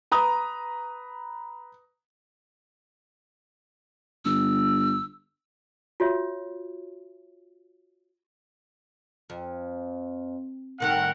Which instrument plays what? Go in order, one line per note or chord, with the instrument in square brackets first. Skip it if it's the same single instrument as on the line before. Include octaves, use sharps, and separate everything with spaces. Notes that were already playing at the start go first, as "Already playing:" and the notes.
[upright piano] B4 A#5 D#6
[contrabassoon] G1 [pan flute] E6
[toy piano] F4 F#4 C#5 E5
[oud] F2
[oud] A2 D#3 G3 [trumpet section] A#4 F#5